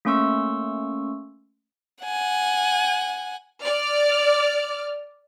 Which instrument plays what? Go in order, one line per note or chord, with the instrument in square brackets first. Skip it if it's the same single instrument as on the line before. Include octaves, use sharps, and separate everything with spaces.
[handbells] A3 A#3 C#4 C6 C#6 E6
[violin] F#5 G#5
[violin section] D5 F6